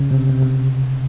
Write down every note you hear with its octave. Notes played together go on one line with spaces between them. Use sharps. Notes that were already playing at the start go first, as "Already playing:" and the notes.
Already playing: C#3
C3
C3
C3